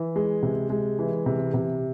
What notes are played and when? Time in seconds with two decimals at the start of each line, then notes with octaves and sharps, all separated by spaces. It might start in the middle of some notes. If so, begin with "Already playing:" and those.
Already playing: E3
0.16 G#3
0.43 C3
0.70 G#3
0.99 E3
1.26 C3
1.54 C3